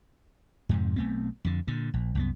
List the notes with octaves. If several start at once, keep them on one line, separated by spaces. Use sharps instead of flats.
F2 G#2 C3
B1 A3 B3 C4
F2 D3
A#2 D3
A#1
C2 F#2 B3